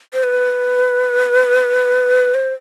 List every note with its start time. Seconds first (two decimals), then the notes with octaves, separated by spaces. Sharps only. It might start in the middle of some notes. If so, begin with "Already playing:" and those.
0.13 C5
0.23 B4
2.34 C5